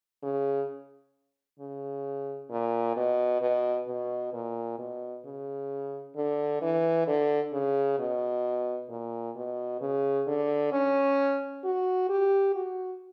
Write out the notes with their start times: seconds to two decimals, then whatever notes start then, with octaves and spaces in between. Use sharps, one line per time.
0.23 C#3
1.59 C#3
2.50 A#2
2.96 B2
3.42 B2
3.88 B2
4.33 A#2
4.78 B2
5.25 C#3
6.16 D3
6.61 E3
7.07 D3
7.53 C#3
7.98 B2
8.89 A#2
9.35 B2
9.81 C#3
10.27 D3
10.72 C#4
11.64 F#4
12.09 G4
12.55 F#4